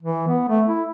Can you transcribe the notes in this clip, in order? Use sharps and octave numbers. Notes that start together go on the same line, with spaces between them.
E3
B3
A3
E4